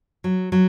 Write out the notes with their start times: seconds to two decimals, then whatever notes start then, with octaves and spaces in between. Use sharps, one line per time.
0.24 F#3
0.52 F#3